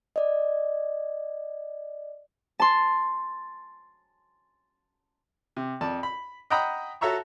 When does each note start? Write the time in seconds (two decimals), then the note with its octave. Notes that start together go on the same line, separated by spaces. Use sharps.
0.16 D5 D#5
2.60 A5 C6
5.57 C3
5.81 F2 D5 A5
6.03 B5
6.50 D#5 F#5 G5 A#5 B5 D#6
7.01 F#4 A4 C#5 E5 A#5 C#6